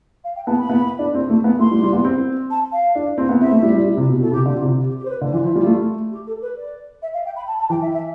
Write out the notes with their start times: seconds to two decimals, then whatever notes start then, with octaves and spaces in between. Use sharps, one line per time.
0.24 F5
0.36 G5
0.46 B3 A5
0.59 B5
0.70 B3
0.99 D4
1.14 C4
1.30 A3
1.44 B3
1.59 A3 C6
1.71 G3
1.83 G3
1.93 B3
2.05 C4
2.50 A5
2.72 F5
2.95 D4
3.18 C4
3.29 B3
3.41 C4 E5
3.51 A3
3.63 G3
3.75 G3
3.85 G3
3.97 C3
4.09 B2
4.20 B2 A4
4.32 C3 G4
4.45 D3
4.53 F4
4.62 C3
4.88 G4
4.98 G4
5.05 C5
5.10 B4
5.21 D3
5.32 E3 F4
5.44 F3 E4
5.56 G3 F4
5.66 A3
6.12 G4
6.27 A4
6.42 B4
6.57 D5
7.02 E5
7.14 F5
7.25 G5
7.36 B5
7.47 A5
7.59 A5
7.70 E3 G5
7.82 E5
7.93 E5